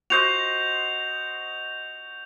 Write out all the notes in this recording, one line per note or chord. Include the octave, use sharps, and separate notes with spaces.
F#4 C5 D#5 G6 F7